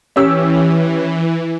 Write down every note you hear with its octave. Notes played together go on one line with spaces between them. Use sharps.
E3 C#4 G4 E6